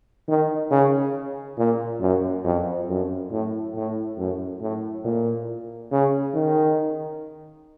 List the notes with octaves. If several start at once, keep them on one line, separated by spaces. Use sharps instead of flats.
D#3
C#3
A#2
F#2
F2
F#2
A2
A2
F#2
A2
A#2
C#3
D#3